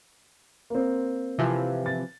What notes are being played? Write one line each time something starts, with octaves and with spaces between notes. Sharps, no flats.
A#3 C4
C3 E3 F3
A6